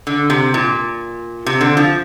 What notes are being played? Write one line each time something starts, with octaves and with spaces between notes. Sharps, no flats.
D3
C3
A#2
C3
D3
F3